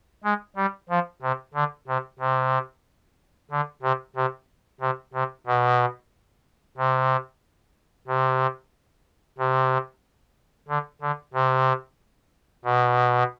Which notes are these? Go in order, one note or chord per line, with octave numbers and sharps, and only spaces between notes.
G#3
G3
F3
C3
D3
C3
C3
D3
C3
C3
C3
C3
B2
C3
C3
C3
D3
D3
C3
B2